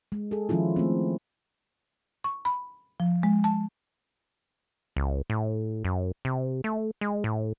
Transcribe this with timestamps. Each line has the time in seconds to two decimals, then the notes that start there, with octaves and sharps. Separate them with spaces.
0.12 G#3
0.31 G#4 A4
0.49 D#3 F3 C#4 E4 F4
0.76 A3 C4
2.24 C#6
2.45 B5
3.00 F3
3.23 G#3
3.44 A5
4.96 C#2
5.30 A2
5.85 F#2
6.25 C3
6.64 A3
7.01 G#3
7.24 A2